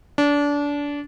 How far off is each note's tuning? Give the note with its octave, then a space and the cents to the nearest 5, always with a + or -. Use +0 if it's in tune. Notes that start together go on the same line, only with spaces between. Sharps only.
D4 -25